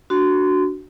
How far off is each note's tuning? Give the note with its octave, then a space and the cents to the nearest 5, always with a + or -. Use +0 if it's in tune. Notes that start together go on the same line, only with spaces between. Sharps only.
D4 +0 F#4 +0 C6 -25